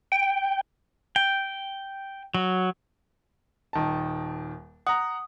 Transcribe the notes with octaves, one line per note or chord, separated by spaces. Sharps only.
G5
G5
F#3
D#1 D#3 A5
F#5 A#5 D#6